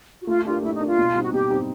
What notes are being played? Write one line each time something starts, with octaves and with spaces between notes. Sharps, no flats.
F#4
A3 F4
D4 F4 G4 A#4
A3 E4
D#4
D4 G4 A#4
F4
B2
G3 C4 D#4
F#4
B2 G4
G3 C4 D#4